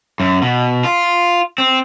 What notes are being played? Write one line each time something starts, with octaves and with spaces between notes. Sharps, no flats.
F#2
B2
F4
C4